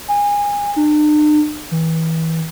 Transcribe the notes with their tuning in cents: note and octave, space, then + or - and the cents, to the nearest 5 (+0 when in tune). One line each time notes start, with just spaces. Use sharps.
G#5 -25
D4 +45
E3 -30